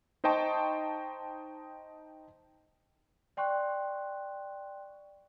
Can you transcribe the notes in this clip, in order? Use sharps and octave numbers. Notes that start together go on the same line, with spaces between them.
D#4 C5 D#5 G5 A5 C#6
D5 G5 C6 C#6 F#6